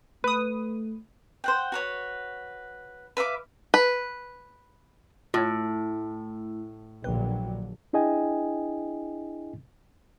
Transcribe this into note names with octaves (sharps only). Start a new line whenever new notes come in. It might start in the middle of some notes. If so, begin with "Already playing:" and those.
A3 B4 D#6
C5 F#5 G5
F#4 B4 C#5
B4 E5 F5 D6
B4
A2 A3 E4 F4 C#5
A#1 D3 F#3 B4 G5
D4 E4 G#4 D#5 G5 G#5